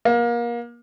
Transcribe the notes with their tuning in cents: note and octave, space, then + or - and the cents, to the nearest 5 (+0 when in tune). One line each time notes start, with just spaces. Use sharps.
A#3 +30